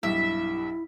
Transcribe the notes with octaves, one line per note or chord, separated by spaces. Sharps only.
B1 G2 E4 E5